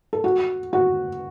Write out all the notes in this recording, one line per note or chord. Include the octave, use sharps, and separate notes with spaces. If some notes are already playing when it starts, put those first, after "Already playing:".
A4
F#4
F#4